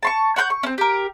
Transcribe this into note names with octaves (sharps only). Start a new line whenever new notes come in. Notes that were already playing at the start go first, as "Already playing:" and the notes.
A5 C6 C#6
C#5 F#5 C6 G6
C#6
C4 C#4
G4 A#4